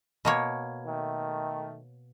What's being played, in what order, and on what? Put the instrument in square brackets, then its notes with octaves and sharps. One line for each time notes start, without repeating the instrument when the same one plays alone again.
[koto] B2 A#3 C#5
[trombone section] D#3 A3